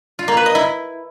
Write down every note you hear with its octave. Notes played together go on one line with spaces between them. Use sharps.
F4
A#3
B4
D#5
E4